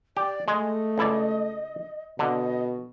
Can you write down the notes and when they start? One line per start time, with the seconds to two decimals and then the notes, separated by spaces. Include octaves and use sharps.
0.17 G4 D5
0.48 G#3 A3 D#5
0.98 C#2 E4 D5
2.19 B2 D3 D#5